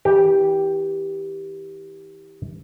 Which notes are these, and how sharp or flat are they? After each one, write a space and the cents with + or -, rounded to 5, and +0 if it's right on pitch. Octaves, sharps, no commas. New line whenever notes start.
E3 -35 G4 +0